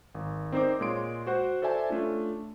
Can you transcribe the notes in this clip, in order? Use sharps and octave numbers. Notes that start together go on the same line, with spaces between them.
G#1
C4 D#4 A#4 C5 D5 D6
A#2 G#3 G#4 C#5 C6 D7
F#4 C5 F#5
A4 C5 D5 E5 G#5 A5
A3 C#4 D4 F4